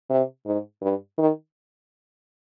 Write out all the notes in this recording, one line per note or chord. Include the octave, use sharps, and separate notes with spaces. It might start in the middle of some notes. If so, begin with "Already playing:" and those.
C3
G#2
G2
D#3